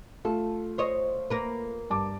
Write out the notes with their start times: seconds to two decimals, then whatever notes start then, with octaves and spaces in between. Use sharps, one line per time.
0.25 A3 F4 A4
0.78 C5 C#5 D#5
1.30 A#3 A#4 B4
1.90 G2 A5 D6